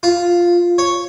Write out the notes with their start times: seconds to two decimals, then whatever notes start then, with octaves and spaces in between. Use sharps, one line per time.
0.03 F4
0.78 C#5